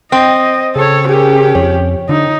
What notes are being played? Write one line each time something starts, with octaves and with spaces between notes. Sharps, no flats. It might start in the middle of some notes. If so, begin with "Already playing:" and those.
C4 D#5
C#3 A4 C#5
C#4 G4 G#4 A#4
F2 C#5
D3 D#4